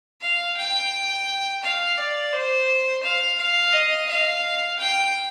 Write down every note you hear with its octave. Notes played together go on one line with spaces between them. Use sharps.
F5
G5
F5
D5
C5
F5
F5
D#5
F5
G5